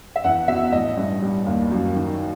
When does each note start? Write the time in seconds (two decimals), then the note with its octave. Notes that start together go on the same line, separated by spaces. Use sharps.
0.16 E5
0.24 E2 F#5
0.48 B2 E5
0.72 A1 D#5
0.97 G2
1.22 G3
1.46 D#2
1.72 F#2
1.96 D#3